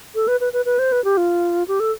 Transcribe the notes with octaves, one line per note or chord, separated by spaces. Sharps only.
A4
B4
B4
B4
B4
C5
B4
G4
F4
G4
A4